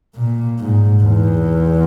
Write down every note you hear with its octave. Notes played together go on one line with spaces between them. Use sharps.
A#2
G#2
E2